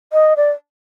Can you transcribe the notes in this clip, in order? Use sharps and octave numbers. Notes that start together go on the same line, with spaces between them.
D#5
D5